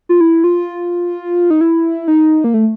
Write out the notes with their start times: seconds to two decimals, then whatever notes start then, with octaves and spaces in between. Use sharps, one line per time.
0.09 F4
0.21 E4
0.44 F4
1.50 D#4
1.61 E4
2.08 D#4
2.44 A#3
2.54 A3